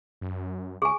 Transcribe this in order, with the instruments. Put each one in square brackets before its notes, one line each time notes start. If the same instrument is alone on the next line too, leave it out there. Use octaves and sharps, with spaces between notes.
[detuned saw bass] F#2
[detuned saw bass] C#2 [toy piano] G#4 G#5 [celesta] C#6